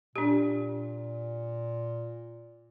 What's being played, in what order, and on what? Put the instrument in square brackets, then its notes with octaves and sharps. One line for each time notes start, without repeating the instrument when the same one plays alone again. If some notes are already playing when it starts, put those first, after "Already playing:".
[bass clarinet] A#2 [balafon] D4 G4